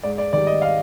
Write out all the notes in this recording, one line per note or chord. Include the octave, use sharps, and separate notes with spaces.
G#2 D5
D5
D#3 G3 D5
D#5
F5